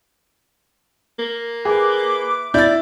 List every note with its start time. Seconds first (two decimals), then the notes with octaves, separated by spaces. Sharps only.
1.19 A#3
1.65 E4 G#4 B4 D6
2.54 E4 D5 G6 A6